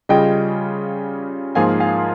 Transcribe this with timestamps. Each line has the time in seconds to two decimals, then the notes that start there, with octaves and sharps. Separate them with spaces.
0.09 C#3 G3 C#4 F4 G#4 D#5 G5
1.55 G#2 F3 A#3 F4 G#4 F5 G#5
1.80 F5 G#5